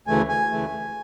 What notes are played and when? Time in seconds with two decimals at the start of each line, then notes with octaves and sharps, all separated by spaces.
0.07 D2 C#3 E3 A3 G#5
0.29 G#5
0.51 D2 C#3 E3 A3